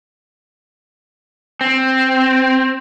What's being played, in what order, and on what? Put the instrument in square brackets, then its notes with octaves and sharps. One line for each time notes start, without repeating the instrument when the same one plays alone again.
[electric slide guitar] C4